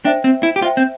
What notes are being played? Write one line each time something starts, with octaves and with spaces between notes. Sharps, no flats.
D4 C5 E5 G5
C4
E4
G4
F4 C5 E5 G5
C4